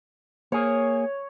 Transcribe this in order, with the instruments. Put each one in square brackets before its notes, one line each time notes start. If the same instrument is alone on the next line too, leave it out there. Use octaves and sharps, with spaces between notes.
[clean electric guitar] A#3 G#4 [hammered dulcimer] C#5